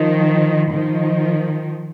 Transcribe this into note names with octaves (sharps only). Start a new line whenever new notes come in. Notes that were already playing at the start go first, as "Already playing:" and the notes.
Already playing: D#3 F3
D#3 F3